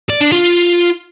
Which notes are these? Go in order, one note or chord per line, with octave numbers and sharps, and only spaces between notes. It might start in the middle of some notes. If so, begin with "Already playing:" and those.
D5
D4
F4